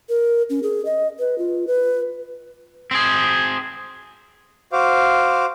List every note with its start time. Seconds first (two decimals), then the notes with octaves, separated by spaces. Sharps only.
0.09 A#4
0.50 C#4
0.63 G#4
0.85 D#5
1.19 B4
1.38 F4
1.67 B4
2.91 C4 G#4
4.72 F#4 C5 F5 D6